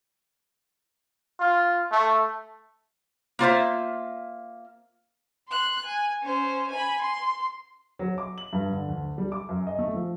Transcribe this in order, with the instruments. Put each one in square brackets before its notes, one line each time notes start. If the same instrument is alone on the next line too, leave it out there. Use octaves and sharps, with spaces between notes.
[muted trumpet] F4
A3
[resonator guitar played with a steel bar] A#3 F4 C5 E5
[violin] C6 F#6
G#5
C#4 C5
G#5 B5
C6
[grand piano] F#3
D6
F#7
G2
D3
D2
G3
D6
F#2
D#5
A3
F3